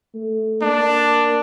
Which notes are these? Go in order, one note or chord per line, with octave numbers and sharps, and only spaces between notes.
A3
A#3 D4